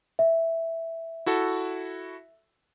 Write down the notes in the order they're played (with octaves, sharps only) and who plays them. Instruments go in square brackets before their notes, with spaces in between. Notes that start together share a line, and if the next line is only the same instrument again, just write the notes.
[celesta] E5
[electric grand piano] E4 F#4 A4